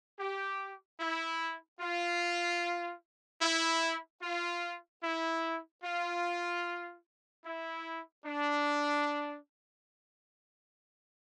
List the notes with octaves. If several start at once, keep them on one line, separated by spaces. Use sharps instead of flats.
G4
E4
F4
E4
F4
E4
F4
E4
D4